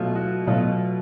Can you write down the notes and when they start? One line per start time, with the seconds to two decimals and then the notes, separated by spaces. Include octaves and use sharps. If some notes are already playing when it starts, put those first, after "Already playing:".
Already playing: B2 F#3 A3 F4
0.15 F#4
0.47 B2 F#3 A3 F4